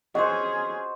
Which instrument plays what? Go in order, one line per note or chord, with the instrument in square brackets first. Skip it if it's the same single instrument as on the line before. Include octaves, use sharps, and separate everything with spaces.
[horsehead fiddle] C#4 G#4 [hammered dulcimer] F#4 C5 [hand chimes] D#5